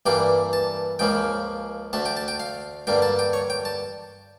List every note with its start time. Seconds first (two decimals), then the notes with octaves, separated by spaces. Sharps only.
0.06 G2 E3 G3 A#3 G5
0.53 A5
0.99 C#2 C#3 F3 A#3 G5
1.93 D2 D3 A3 A5
2.06 G5
2.17 A5
2.28 G5
2.40 F5
2.87 G2 D3 G3 A#3 G5
3.02 A5
3.19 G5
3.33 C#5
3.50 G5
3.65 A5